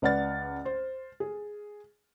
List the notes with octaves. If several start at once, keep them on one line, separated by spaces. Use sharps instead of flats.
C#2 B4 D5 F#5 F6 A6
C5
G#4